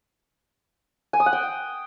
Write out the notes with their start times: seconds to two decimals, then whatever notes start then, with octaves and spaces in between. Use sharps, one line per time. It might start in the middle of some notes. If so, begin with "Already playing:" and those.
1.13 G#5
1.20 D#6
1.26 F#5
1.33 G5